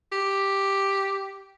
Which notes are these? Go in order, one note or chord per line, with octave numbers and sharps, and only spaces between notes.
G4